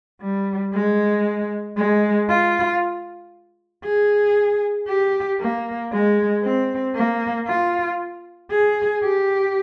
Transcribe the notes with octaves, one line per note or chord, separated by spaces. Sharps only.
G3
G#3
G#3
F4
G#4
G4
A#3
G#3
C4
A#3
F4
G#4
G4